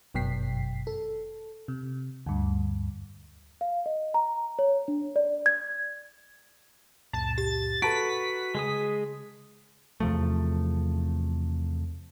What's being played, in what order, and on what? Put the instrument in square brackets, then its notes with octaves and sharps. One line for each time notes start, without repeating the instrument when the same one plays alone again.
[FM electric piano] G1 F#2 B2 G5 B6 C7
A4
C3
D2 G2
[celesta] F5
D#5
A#5
C#5
D4
D5
G#6
[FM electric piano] C#2 F#2 A#2 [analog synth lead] A5
[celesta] G4 [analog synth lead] A6
[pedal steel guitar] F#4 B4 [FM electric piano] A4 A#5 [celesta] A5 A6 D7 [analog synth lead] B6
[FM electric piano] C#3 [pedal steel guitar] G#3 G#4 D#6
[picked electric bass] E2 C3 F3 A3